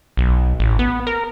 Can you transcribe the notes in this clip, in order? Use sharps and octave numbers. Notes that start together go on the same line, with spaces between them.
B1
A1
B3
A#4